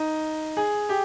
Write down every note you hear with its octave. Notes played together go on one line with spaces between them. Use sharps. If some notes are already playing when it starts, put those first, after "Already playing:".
Already playing: D#4
G#4
G4